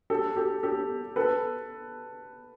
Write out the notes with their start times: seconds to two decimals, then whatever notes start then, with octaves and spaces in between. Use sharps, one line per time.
0.10 G4 A4
0.37 G4 A4
0.63 G4 A4
1.16 A4 B4